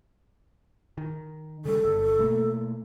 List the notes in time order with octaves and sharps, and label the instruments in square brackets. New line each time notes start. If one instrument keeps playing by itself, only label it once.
[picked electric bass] D#3
[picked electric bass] C#3 G3 [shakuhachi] A4
[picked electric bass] G1 G2
B2 A3 A#3